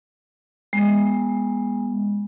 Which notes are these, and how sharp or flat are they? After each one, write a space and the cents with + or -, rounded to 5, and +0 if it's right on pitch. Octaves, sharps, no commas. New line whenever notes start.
G#3 -25 B3 -20